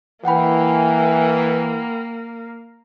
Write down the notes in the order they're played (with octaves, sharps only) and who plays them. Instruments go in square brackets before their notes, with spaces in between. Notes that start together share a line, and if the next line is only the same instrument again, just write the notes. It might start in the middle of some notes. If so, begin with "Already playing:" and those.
[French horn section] E3 [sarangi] A#3 [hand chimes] F#5 G5 B5